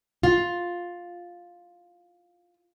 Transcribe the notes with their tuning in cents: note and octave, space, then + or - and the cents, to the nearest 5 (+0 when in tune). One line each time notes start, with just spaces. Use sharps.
F4 +5